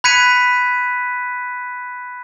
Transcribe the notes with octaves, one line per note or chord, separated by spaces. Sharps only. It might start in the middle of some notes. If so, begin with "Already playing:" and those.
B5 F#6 G#6 B6 C#7 D#7